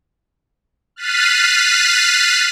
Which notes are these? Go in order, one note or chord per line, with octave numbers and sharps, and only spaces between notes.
F6 F#6 A6 B6 C7 D#7